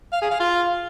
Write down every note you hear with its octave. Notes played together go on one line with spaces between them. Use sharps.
F5
G#4
F5
F4